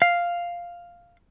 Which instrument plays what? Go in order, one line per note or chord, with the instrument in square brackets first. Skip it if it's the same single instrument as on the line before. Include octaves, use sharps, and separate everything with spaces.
[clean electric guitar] F5